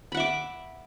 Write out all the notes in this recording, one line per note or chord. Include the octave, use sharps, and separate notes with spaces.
E5 F#5 B5 D6